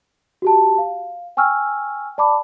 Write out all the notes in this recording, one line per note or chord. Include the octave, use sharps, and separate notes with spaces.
F#4 G4 A5
F5
G5 G#5 C#6 E6 F6
D5 A5 B5 D6